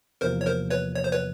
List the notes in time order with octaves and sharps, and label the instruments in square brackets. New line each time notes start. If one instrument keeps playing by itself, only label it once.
[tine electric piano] E2 C3 F3 A#3 [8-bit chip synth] A#4 C5
[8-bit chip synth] C#5
A#4 C5
B4 C#5
C#5
C5
B4 C#5